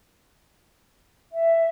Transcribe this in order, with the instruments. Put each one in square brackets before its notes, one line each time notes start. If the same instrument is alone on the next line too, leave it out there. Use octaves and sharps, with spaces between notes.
[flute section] E5